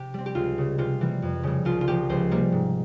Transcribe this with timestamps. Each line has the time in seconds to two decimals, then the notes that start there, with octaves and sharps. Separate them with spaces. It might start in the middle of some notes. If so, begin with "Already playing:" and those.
Already playing: C3 G4
0.14 G3 C4
0.26 G4
0.35 C#2 F4
0.58 C#3 G3
0.78 C3 F4
1.01 E3 G3 A#3
1.22 F2
1.43 C#3 G3
1.65 C2 F4
1.81 F4
1.87 C3 F3 C4 G4
2.09 C#2 C5
2.31 C3 G3 A#3
2.52 G#2